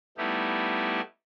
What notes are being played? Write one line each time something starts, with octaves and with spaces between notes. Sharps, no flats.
G3 A3 B3 D#4 E4 G4